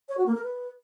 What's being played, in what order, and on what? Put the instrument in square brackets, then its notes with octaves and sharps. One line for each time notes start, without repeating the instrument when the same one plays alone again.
[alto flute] C#5
F#4
A#3
A#4
B4